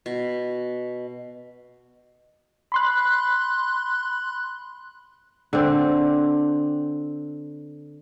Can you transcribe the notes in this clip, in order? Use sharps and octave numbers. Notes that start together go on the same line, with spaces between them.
B2
B5 C6 F#6
D3 C4